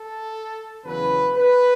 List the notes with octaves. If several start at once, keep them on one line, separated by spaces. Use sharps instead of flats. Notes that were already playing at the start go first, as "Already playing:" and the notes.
Already playing: A4
E2 C#3 F#3 B4
B4